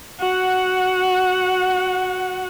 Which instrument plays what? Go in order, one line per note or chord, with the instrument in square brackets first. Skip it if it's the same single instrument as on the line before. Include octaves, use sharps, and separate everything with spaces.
[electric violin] F#4 F#5